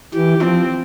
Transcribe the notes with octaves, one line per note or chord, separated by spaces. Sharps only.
E3 G4
F3 C4